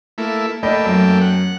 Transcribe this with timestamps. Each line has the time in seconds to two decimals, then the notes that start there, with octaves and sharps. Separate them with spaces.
0.18 A3 A#3 E4
0.63 A3 A#3 D5 D#5 G5 B5
0.86 F#2
1.21 F#5